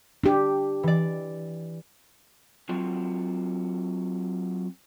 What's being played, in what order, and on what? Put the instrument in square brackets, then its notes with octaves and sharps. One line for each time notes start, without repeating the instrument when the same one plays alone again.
[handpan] D4 G4
[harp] E3 D5
[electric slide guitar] F#3 C4 F4 F#4